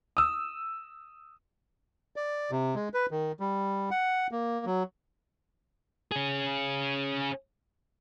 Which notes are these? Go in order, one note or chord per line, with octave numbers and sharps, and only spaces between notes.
D#6 E6
D5
C3
G#3
B4
D#3
G3
F#5
A#3
F#3
C#4 G#4